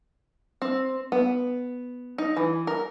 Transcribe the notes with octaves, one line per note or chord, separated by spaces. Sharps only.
C4
B3
D#4
E3
A#4